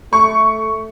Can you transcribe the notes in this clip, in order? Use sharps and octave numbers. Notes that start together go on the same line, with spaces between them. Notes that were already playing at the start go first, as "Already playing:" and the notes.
A3 C#6